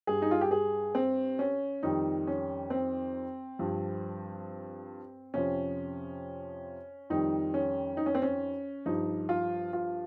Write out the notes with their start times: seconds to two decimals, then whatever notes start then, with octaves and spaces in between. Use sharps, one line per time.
0.07 G2 G3 G#4
0.22 D#4
0.31 F4
0.41 G4
0.51 G#4
0.95 C4
1.39 C#4
1.83 F2 D#3 G3 D#4
2.27 C#4
2.70 C4
3.59 G2 F3
5.34 F2 C3 F3 C#4
7.10 F2 D#3 G3 D#4
7.54 C#4
7.97 D#4
8.06 C#4
8.15 C4
8.22 C#4
8.86 G2 F3 D#4
9.29 F4
9.73 F4